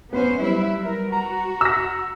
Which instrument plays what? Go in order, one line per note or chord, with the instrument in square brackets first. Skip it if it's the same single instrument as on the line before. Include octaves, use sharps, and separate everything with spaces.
[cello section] B3 C#4 C5 [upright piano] B4
[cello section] F#3 E4 E5 [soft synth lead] G3
[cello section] A#4
[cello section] F#4 [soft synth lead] A#5
[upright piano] E6 A#6